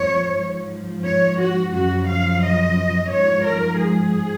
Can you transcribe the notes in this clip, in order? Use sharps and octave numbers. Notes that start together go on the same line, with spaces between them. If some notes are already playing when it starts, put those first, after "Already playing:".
Already playing: F2 F3 C#5
G#2 F3
C#5
F#4
F#2 C#3 F3 F#4
F5
D#5
G#2 F3 C#5
A#4
G#4